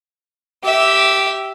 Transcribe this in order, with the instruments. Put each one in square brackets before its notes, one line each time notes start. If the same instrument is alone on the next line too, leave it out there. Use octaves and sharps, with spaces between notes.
[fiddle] G4 E5